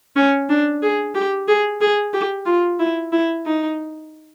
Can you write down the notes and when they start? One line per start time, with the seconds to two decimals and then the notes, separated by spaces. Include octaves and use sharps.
0.16 C#4
0.49 D4
0.82 G#4
1.15 G4
1.48 G#4
1.81 G#4
2.14 G4
2.46 F4
2.80 E4
3.12 E4
3.46 D#4